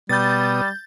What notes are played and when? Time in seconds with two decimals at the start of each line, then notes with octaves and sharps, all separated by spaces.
0.09 B2 G3 B3 D#6 G6 A6